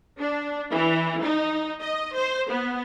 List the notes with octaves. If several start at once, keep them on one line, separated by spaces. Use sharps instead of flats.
D4
E3
D#4
D#5
C5
B3